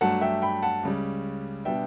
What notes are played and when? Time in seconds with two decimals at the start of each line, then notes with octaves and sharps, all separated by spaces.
0.01 G2 F#3 A3 D4 F#5 A5
0.21 E5 G5
0.42 G5 B5
0.62 F#5 A5
0.83 C#2 C#3 G3
1.65 B2 G3 B3 D4 E5 G5